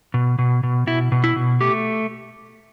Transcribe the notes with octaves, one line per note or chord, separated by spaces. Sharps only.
B2
B2
B2
B2 E4
B2
E4
B2
A3 G4